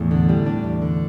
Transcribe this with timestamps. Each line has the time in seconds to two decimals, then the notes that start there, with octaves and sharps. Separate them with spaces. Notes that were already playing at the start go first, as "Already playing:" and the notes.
Already playing: E2 A2
0.11 D3
0.29 G3
0.46 D4
0.64 E2
0.82 D3